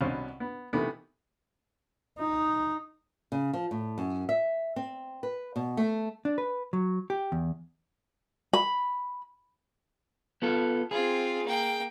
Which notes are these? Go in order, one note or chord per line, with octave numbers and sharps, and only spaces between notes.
C2 B2 C#4 C5 F5
B3
C3 D#3 E3 A3 B3
D#4
C#3
F3
A2
F#2
E5
C4
B4
B2
A3
D4
B4
F#3
G4
E2
B5
B3 F4 A4
C4 F4 G#4
A#3 G5